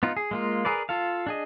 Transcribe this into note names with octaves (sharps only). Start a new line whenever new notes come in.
B3 D#4 F4
G#4
G#3 A#3 F4
G#4 A#4 B4 D5
F4 A4 F5
D4 G#4 D#5